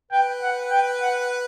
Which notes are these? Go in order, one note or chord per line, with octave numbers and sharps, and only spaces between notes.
B4 G5
F#5
G5
F#5